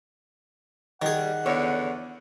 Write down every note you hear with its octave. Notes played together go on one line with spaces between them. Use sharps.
D#3 G3 G#4 F#5
E2 D3 C#5